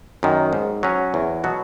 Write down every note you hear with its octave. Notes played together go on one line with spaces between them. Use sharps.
F#2 D#3
G#2
F#3 C#4
E2
B2 F#3 B3 F#4